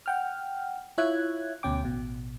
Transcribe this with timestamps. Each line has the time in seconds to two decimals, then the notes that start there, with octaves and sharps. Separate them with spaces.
0.06 F#5 G5 F6
0.98 E4 F4 C#5 E5 F#6 G#6
1.63 D2 B2 C#4 G5 D6
1.83 A1 B2